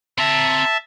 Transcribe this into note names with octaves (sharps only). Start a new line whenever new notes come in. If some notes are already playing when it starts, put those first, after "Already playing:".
C4 E5 A5 A#5